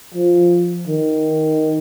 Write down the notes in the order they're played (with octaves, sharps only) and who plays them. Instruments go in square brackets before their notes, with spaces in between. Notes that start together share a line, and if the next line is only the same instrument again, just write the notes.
[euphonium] F3
D#3